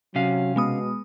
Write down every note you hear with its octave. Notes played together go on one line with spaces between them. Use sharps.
C3 F#3 C#4 F5
B2 G#3 B3 D#6